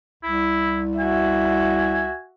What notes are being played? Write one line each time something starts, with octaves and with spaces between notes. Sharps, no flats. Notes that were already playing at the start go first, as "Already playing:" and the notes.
C2 E4
F#4 E5 G#5